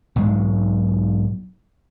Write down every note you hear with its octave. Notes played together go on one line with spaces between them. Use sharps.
B1 G#2 F#3 G#3